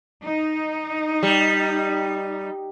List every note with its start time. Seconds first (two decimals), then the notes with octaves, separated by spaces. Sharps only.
0.25 D#4
1.23 G3